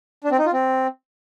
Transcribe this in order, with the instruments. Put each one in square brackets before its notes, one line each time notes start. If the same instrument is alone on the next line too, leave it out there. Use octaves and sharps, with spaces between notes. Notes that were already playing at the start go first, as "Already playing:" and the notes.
[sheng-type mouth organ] D4
C4
D#4
F4
C4